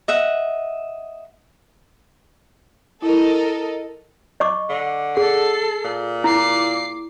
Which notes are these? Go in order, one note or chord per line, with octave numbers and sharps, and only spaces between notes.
D#5 E5 F#5
E4 A4 A#4 D#5
D#5 C#6 D6
D3
G#4 A4 C7
A#2
E4 D6 C7